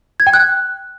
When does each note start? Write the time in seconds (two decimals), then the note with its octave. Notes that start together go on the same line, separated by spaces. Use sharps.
0.20 G#6
0.27 G5
0.34 F#6